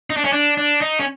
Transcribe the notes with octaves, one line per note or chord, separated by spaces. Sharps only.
D#4
D4
C#4
D4
D4
D#4
C#4